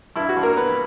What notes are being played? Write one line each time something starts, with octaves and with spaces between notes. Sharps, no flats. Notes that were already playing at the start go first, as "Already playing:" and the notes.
G2 E4
F#4
G2
A#3 A#4
B3 B4